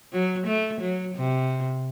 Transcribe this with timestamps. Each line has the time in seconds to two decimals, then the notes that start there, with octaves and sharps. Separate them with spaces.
0.12 F#3
0.47 A3
0.81 F#3
1.15 C3